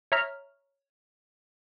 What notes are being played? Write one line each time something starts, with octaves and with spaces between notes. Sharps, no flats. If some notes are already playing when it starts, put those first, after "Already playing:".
C#5 E5 A#5 F6